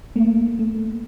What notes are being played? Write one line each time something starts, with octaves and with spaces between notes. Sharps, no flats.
A3 A#3
A3